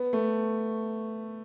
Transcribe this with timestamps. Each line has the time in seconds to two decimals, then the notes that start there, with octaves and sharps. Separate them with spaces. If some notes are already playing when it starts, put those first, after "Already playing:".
Already playing: B3
0.13 A3